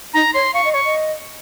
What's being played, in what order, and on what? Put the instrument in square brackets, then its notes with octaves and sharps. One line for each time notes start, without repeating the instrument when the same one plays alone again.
[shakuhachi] D#4 [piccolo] A#5
[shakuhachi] C#5 [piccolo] C6
[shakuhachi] F5 [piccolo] C#6
[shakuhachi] D#5
[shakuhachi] C#5 [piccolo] C#6
[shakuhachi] D#5